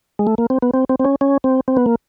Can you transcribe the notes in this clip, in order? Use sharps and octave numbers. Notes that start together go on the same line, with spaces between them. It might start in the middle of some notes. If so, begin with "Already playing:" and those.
G#3
A3
A#3
C4
B3
C4
C4
C4
C#4
C#4
C4
C4
B3
A#3